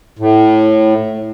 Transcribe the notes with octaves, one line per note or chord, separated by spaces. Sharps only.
A2